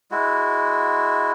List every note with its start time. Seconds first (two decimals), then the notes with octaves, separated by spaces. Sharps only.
0.11 G#3 E4 F#4